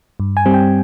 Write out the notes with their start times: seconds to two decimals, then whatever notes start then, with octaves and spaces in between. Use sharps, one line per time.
0.20 G2
0.37 G#5
0.46 G3 C4
0.54 G5